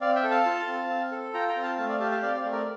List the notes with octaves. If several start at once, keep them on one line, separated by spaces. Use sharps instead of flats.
C4 D5 F5
E5 G5
A4
F5 A5
F4
C4
C4
A4
F4 G5 A#5
G5 A#5
C4
F5 A5
A3 F5 A5
D5 F5
G4 F5 A5
F5 A5
C4 D5 F5
D5 F5
A3
A#4 D5